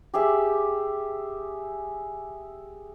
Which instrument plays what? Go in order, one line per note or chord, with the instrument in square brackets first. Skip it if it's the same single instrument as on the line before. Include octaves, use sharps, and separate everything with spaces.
[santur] G4 G#4 E5